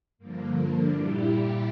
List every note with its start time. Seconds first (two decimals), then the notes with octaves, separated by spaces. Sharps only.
0.18 G2 D3 F3 A#3
0.54 A#3 D4
0.89 A#2 G3 E4 G4